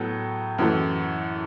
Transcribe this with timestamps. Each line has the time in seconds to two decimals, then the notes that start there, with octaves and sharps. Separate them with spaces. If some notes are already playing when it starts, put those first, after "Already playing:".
Already playing: A2 F#3 B3 A4
0.58 F#2 E3 A3